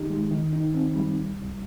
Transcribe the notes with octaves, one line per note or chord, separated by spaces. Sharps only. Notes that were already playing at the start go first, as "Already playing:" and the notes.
Already playing: D#3 D#4 G4
G#3
D#3
D#4
C4
G3
C2
C2